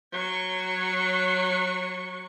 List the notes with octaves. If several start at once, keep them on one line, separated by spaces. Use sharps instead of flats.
F#3 C#6